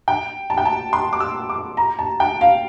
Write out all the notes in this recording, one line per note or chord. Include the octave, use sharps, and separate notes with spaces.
G5
A5
G5
A5
C6
D6
E6
D6
A#5
A5
G5
F5